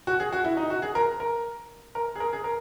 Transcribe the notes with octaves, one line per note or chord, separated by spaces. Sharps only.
F#4
G#4
F#4
E4
D#4
F#4
G#4
A#4
A#4
A#4
G#4
A#4
G#4
A#4